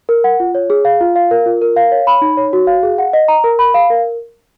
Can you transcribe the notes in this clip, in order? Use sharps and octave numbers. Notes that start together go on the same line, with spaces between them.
A#4
F#5
F4
C#5
G#4
F5
F4
F5
A#4
F4
A#4
F5
C#5
B5
D#4
C#5
F#4
F5
G#4
F#5
D#5
A#5
A#4
B5
F5
A#4